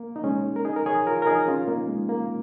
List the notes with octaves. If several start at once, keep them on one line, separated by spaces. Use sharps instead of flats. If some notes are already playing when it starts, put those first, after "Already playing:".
Already playing: A#3
D#4
G#3 C#4
A#4
D#4 G#4
A#4
G#4 C#5
F4 A#4
A#4
D#4 G#4
C#4 F4
A#3 D#4
G#3
A#3